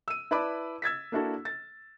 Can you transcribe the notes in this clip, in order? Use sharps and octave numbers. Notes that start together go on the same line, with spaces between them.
E6 D#7
E4 B4 D5 A5 B5 D6
E6 G#6 A6 B6
A#3 D4 E4 F#4 A4
A6